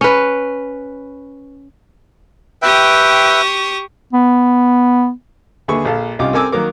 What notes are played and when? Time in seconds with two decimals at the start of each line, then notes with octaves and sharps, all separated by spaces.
0.01 C#4 B4
2.62 G4 B4 E5 G5 C#6 D#6
4.13 B3
5.68 D#2 D3 G#4 B4 E5 C#6
5.85 A#1 A4 F5 A5
6.19 C2 C#4 D#4 F4 D6
6.33 C4 A4 A#4 G#5 D6 E6
6.52 D#3 F#3 A#3 A#4 D6